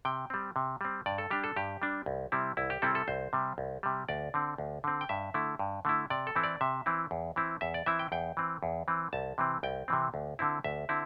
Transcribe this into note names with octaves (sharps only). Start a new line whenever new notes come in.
C3 G5
G3 C4
C3
G3 C4
G2 D5
A4
G3 D4 G4
A4
G2 G4
G3 D4
C2
C3 G3 C4 E4
C2 E4
G4
C3 G3 C4 E4 A4
A4
C2 C5
C3 G3
C2
C3 G3
D2 D5
D3 C4
D2
D3 C4
G5
G2 E5
D3 A3 E4
G2
D3 A3 E4
C3 D5
A4
E3 C4 E4
D5
C3 E5
E3 C4 E4
E2
E3 C4 E4
E2 E5
D5
E3 C4 E4 E5
G5
E2 G5
E3 C4
E2
E3 C4
C2 A5
C3 E3 C4
C2 G5
C3 E3 C4
D2
D3 C4 E4
D2 E5
D3 C4 E4